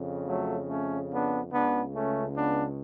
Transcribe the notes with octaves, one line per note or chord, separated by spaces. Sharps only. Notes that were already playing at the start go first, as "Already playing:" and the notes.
Already playing: F2 C#3
F#3 A3
A3 C#4
B3 D4
C#2 C#3 B3 D4
A3 C#4
B3 D4